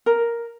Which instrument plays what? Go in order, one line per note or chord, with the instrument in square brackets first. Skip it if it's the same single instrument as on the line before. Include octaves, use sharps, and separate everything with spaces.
[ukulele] A#4